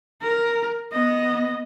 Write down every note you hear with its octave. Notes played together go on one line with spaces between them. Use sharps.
A#4
B3 D#5